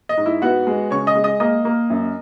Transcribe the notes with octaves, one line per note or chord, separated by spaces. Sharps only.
D#5
G#2
E4 E5
B3 F#4 F#5
G#3
C#3 C#5 C#6
D#5 D#6
G#3
D#5 D#6
A#3 D#5 D#6
A#3
F#2